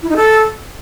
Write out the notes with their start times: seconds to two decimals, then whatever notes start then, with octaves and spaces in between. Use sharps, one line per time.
0.02 E4
0.09 D#4
0.16 A4